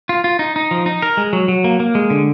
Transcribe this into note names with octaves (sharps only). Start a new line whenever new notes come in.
F4
F4
D#4
D#4
F3
D#4
A#4
G#3
F#3
F#3
A#3
A#3
G#3
D3